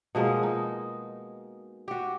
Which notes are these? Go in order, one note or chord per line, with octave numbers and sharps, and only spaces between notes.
B2 F3 G#3 A#3
D#4
F#4 G4